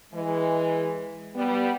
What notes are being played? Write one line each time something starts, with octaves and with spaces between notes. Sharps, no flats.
E3 G#3
G3 B3